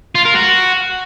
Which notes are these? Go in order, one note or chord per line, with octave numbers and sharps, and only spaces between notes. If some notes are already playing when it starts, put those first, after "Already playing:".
F4
A#4
F#4